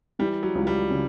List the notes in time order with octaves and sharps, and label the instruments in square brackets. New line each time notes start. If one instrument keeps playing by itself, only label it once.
[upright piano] E3 [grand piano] G3
[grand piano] F#3
[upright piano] C#2
[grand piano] G3
[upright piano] C#3